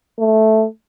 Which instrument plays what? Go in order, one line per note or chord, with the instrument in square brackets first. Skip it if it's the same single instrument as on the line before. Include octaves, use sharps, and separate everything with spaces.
[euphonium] A3